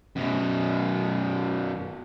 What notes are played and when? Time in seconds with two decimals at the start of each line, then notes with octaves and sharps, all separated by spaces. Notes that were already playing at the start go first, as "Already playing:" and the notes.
0.16 F#2 B2